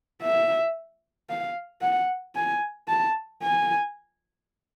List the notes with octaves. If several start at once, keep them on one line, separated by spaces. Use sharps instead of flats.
E5
F5
F#5
G#5
A5
G#5